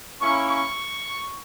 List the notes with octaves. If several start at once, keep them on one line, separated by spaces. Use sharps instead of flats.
A#3 C#4 E4 C#6
C#6